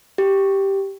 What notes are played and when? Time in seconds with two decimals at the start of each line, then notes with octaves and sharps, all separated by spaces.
0.18 G4